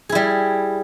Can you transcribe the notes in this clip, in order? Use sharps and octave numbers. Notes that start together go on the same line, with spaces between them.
G3 E4 G#4